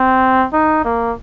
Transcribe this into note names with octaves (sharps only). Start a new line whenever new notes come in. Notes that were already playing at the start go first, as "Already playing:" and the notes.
Already playing: C4
D#4
A#3